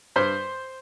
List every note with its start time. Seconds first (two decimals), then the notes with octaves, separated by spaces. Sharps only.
0.16 G2 C5